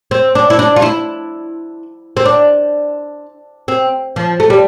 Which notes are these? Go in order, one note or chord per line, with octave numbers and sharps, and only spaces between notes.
C4
D4
E4
D4
F4
E4
C4
D4
C4
F3
A3
G3